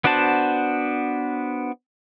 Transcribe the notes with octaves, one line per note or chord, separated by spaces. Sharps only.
B3 D4 F#4 C5 A5